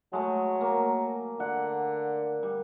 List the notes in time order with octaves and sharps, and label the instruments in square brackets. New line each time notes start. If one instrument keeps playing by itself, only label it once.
[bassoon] F#3 [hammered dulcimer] G#3 A3
[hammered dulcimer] A#3
[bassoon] D3 [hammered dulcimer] F#5
[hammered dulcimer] G3